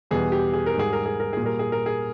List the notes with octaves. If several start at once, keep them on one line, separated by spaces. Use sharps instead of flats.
E2 B2 G3 G#4
G4
G#4
A#4
G#2 G3 G#4
A#4
G#4
A#4
A#2 G#4
G3 A#4
G#4
A#4
G#4